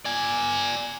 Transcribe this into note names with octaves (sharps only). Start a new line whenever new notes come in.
D5 G#5